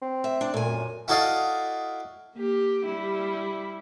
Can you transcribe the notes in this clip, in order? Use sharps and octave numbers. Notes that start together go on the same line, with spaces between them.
C4
E5
D4
A#2 A3 G#5
F#2
E4 F#4 A4 D5 D#5 F5
A#3 G4
G3 E4